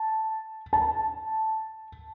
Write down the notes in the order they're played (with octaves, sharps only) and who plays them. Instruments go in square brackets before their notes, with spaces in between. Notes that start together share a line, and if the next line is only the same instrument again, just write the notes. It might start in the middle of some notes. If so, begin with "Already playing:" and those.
Already playing: [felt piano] A5
A5